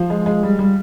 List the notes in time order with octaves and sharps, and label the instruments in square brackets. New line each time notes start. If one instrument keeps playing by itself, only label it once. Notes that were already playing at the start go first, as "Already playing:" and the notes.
Already playing: [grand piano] F3 F5
G#3
G#3
G3
G3